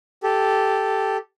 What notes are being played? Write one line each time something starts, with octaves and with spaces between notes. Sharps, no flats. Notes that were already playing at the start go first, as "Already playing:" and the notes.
G4 A4